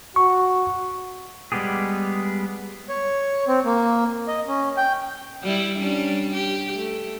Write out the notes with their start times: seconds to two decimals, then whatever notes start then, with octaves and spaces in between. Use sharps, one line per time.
0.16 F#4 C#6
1.52 G3 G#3 B3 G4 G#4
2.89 C#5
3.48 C4
3.65 A#3
4.28 D#5
4.48 C#4
4.77 G5
5.43 G3 E4
5.79 G3 C#4 D4
6.33 G4
6.74 A3